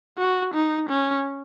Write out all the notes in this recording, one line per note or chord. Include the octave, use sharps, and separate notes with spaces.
F#4
D#4
C#4